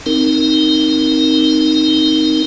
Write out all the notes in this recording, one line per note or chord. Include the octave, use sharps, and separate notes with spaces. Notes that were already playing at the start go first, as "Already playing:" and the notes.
C4 D#4 A#4